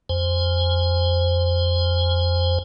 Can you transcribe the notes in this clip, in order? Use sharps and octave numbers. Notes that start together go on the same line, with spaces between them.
F2 C5 G#5